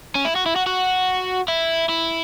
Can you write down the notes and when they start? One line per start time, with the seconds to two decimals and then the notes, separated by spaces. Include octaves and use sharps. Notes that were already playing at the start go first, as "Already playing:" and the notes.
0.15 C#4
0.25 E4
0.36 F#4
0.46 E4
0.56 F#4
0.66 F#4
1.48 E4
1.89 E4